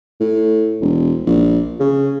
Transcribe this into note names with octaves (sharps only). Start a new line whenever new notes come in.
A2
E1
A#1
C#3